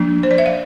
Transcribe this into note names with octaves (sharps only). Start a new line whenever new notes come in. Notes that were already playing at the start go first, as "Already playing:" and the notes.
Already playing: F3 A#3 D4
C5
D5
E5
F5